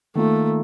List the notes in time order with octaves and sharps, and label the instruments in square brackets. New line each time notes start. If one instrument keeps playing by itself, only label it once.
[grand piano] D#3 A#3 F4 [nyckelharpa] A3